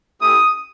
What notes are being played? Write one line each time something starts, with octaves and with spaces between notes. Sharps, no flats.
A3 C#4 E4 G4 D#6